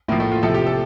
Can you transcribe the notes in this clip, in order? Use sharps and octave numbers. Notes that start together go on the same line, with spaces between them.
A2 F3 A#3
A3
F4
C3 F3 A4
G4
A4